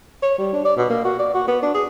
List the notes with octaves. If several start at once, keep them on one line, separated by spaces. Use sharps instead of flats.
C#5
G3
D4
D5
B2
A#3
F#4
D5
F#4
B3
D4
G#4